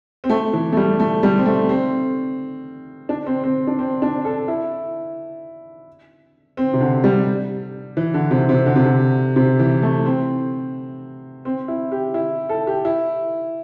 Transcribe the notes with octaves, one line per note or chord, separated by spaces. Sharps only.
C4
A3
E3
A3
G3
A3
G3
C4
A3
C4
D4
C4
C4
D4
C4
D4
A4
E4
C4
C3
D3
G3
E3
D3
C3
C3
D3
C3
D3
C3
E3
A3
C4
C4
E4
G4
E4
A4
G4
E4